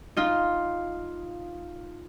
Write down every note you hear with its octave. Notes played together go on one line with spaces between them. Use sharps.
D#4 F4